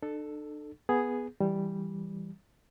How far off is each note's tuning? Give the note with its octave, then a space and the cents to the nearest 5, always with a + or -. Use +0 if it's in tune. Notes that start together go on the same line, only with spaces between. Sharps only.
D4 +40 A4 +0
B3 +0 G#4 +0
E3 +0 G3 +0